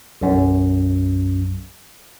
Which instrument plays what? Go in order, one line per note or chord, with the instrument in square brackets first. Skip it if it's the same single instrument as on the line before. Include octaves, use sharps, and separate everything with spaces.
[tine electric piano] B1 F#2